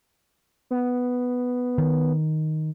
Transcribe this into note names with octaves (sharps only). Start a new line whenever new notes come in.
B3
D#3